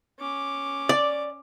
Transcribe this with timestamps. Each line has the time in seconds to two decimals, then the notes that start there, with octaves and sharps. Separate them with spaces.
0.19 C#4 D6
0.89 D5